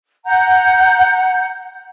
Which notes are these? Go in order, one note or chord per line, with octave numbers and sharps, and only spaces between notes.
F#5 A#5 G6